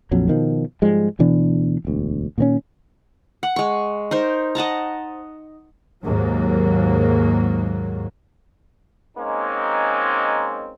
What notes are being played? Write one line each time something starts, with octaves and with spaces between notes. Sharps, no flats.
A#1 F2 F#3
B2 D#3 F3
G#2 F3 G3 G#3
D2 B2 E3 D4
E1 D2
A#2 D#3 C4 C#4
F#5
G#3 C#6
D#4 A#4 C5
D#5 F#5 A5 A#5
D#2 G#2 F#3 A#3
G#3 A#3 C4 C#4 D#4